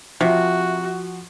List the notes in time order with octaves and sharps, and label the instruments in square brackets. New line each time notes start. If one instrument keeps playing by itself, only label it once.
[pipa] C3 [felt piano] F3 [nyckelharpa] F#4